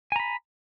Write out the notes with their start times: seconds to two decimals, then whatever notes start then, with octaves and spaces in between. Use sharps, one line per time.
0.12 G#5
0.16 A#5
0.20 B5